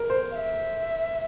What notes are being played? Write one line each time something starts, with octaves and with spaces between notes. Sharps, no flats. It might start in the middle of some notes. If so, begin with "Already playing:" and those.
Already playing: A#4
C5
F5
E5